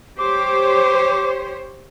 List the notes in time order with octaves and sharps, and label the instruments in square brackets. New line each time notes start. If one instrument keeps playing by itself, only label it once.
[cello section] G4 C5 C#5 [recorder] D6